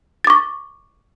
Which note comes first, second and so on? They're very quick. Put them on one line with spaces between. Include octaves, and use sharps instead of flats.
A6 D6 C#6